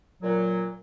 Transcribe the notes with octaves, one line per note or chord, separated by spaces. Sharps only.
A#2 F#3